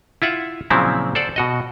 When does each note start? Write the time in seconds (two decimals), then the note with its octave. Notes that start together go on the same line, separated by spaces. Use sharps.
0.22 E4 F4 E5 F#5
0.70 A#2 C#3 F3 F#3 C4 E4
1.15 A4 C5 D5 F#5
1.36 B2 F#4 D#5